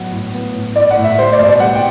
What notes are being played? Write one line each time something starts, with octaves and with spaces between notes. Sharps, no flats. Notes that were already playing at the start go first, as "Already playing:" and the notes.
Already playing: A2 F#3 B3 F#5
A2
B3
A2
A2 D5
F#5
A2
E5
G3 C5
D5
B2
D5
G3 F#5
G5